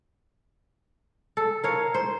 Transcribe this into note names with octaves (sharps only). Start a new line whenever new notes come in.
A4
A#4 C#5 F5
C5